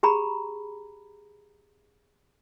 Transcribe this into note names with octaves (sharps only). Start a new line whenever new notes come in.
G4 G#4 A#5 B5